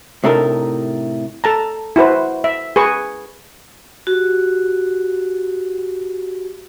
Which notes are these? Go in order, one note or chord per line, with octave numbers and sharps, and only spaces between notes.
A2 C3 D4 D#4 A4 A#4
A4 A5 A#5
E4 F#4 B4 C5
E5
G#4 B4 C#6
F#4 G4